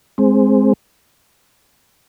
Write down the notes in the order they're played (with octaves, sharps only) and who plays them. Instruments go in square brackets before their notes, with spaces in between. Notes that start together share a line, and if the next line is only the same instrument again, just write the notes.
[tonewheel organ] G#3 C4